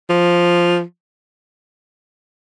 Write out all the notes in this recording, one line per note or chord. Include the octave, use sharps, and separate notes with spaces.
F3